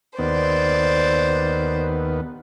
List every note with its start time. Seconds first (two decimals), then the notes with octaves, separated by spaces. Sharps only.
0.19 D#2 B3 C5 D5